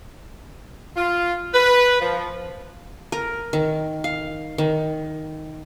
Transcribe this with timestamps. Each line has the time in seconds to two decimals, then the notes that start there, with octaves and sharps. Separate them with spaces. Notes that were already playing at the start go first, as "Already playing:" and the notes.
0.96 F4
1.54 B4
2.01 F3
3.12 A#4
3.53 D#3
4.04 F5
4.58 D#3